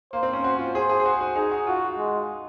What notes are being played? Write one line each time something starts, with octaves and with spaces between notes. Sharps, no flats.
A#3 C5
C4
C#4
F#4
F4
G#4 C5
G#4
G#4
F#4
F#4
D#4 G#4
F#4
F4 F#4
G#3